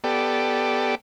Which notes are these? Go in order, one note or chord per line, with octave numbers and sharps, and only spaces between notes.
B3 G4 A4 D5